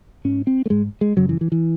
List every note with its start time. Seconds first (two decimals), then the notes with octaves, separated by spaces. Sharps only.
0.25 G#2 C#4
0.47 C4
0.66 A3
0.70 G#2 G#3
1.01 G#3
1.17 F#2 C#3 F#3
1.29 E3
1.41 E3
1.52 E3